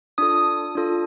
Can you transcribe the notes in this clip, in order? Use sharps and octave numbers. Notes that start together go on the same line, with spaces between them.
D4 F4 A4 D#6
D4 F4 A4